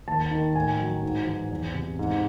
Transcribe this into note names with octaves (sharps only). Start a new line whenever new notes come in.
D#2 A5
D#3
A2 G#5
F#3
G#2
E3
E2
C3
G#2